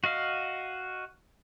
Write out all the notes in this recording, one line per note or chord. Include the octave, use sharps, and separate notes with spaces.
F#4 D#5 F5